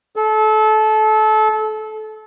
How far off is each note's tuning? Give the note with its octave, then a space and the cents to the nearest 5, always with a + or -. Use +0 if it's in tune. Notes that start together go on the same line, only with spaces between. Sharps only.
A4 -25